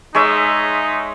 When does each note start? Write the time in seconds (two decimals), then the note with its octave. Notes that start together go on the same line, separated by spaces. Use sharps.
0.15 G#3 D#4 C#5 E5